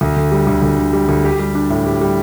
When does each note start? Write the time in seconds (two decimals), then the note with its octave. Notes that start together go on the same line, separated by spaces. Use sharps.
0.01 D2
0.17 D3
0.32 G3
0.47 D2
0.62 D2
0.78 D3
0.93 G3
1.09 D2
1.24 G4
1.39 G3
1.55 D4
1.70 A2
1.86 G4
2.01 G3